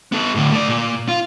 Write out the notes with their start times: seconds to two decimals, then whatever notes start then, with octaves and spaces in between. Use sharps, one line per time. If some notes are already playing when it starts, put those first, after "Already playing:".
0.12 B3 A4
0.35 A2 D3
0.52 A3 D5
0.68 A#2
1.08 F4